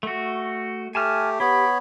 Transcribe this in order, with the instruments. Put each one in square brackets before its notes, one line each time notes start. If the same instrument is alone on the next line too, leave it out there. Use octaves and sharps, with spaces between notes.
[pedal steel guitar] A3 F#4
[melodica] A3 G4 [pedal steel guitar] G#5 A5 F6
[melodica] B3 C#5 B5 [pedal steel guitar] G4